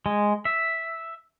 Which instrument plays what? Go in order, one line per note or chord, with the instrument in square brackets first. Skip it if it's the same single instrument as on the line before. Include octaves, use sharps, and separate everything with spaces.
[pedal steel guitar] G#3
E5